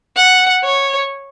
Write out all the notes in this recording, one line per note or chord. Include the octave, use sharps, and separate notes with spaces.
F#5
C#5